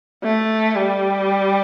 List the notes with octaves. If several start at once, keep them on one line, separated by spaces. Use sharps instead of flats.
A3
G3